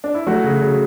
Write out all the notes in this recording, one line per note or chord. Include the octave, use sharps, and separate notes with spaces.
D4
E4
F#3 A3 F#4
C#3
C#3